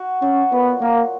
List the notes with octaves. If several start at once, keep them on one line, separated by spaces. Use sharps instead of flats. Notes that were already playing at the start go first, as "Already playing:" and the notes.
Already playing: F#4
F#3 C#4
A#2 B3
A#2 A#3